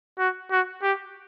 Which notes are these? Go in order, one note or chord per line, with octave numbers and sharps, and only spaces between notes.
F#4
F#4
G4